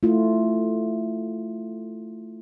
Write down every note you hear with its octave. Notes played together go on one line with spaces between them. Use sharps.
A3 E4 F4